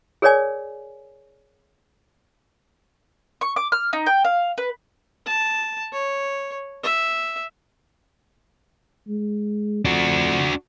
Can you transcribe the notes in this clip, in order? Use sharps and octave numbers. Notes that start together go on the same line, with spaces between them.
G#4 A#4 C#5 D5 G#5
C#6
D6
F6
D#4
G5
F5
B4
A5
C#5
E5
G#3
F2 D4 F#4